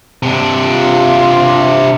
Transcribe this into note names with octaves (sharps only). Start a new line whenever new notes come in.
C3 D4
F4